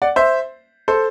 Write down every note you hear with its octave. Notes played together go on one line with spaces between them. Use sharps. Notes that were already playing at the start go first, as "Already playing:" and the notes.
D5 F#5
C5 E5
A4 C5